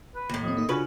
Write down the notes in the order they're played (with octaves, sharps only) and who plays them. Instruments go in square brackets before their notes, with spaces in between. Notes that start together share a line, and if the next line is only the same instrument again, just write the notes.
[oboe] B4
[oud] D#2 A2
[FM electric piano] F3 C4 [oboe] D#5
[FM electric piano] A#3 D#4
[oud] C#3 B4 [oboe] C#4 [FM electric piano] D4 F4 F#4